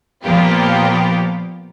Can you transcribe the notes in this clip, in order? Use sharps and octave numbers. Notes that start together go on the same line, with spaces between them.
A#2 F3 A#3 B3 F4 G4